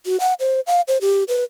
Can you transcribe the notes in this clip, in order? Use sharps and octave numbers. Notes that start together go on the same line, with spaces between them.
F#4
F#5
C5
F5
C5
G4
B4